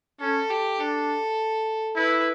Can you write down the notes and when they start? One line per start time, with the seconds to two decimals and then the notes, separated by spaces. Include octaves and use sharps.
0.21 C#4 A4
0.50 G4
0.79 D4 A4
1.96 E4 B4